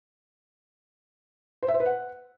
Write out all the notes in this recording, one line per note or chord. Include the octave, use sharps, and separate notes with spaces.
C5
E5
C5
B4
F#5